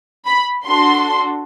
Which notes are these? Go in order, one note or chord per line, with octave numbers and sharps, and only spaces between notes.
B5
D4 F#4 A4 C6